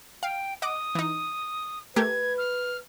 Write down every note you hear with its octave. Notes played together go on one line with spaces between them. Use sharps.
F5 G5
D#5 F#5 D6 D#6
E3 D#4
A3 G4 A#4 B4 G#6
F6